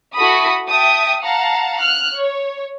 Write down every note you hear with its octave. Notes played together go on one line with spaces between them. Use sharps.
E4 F#4 A4 B5 D#6
E5 G5 A5 D#6
F5 F#5 A5 A#5
F6 F#6
C#5